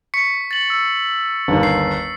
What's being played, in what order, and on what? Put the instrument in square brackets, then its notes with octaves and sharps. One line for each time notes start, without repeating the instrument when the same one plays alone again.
[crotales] C#6 B6 C#7
A6 F#7
E6
[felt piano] G1 D#2
[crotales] C7